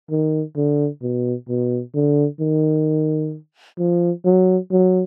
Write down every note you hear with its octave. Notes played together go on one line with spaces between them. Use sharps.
D#3
D3
B2
B2
D3
D#3
F3
F#3
F#3